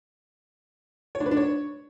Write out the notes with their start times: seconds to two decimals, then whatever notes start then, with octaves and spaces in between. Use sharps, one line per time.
1.15 C#5
1.20 D4
1.26 B4
1.31 D4
1.37 C#5